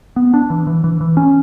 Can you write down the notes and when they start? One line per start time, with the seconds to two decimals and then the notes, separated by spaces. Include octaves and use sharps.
0.16 B3
0.34 D4
0.50 E3
0.67 E3
0.84 E3
1.01 E3
1.17 C#4